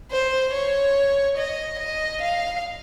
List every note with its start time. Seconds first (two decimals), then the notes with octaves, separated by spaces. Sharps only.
0.12 C5
0.53 C#5
1.38 D#5
1.79 D#5
2.21 F5